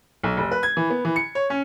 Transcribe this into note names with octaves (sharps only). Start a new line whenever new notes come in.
B1
F1
B4
G#6
E3
B3
E3
C#7
C#5
C#4